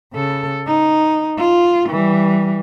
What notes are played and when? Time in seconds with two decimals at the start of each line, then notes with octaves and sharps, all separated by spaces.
0.13 C#3 A4
0.67 D#4
1.38 F4
1.89 E3 G3